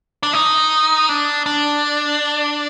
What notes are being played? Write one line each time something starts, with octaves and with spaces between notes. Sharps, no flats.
D4
D#4
D4
D4